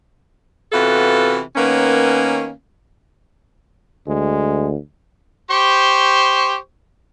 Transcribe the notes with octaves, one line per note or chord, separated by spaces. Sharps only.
C3 E3 B3 F4 F#4 A4
D#3 A#3 B3 C#4
D2 G#3
G4 C5 C#6